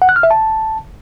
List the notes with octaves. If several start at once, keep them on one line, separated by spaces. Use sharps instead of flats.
F#5
F#6
F6
E5
A5